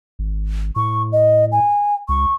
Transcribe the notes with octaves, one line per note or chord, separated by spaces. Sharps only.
G#1
A2 C#6
D#5
G#5
C#2 C#6